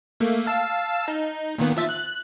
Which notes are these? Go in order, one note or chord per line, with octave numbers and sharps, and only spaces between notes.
A3 A#3
F5 A5 E6
D#4
A#2 D#3 B3
F3 E5 A6
F#6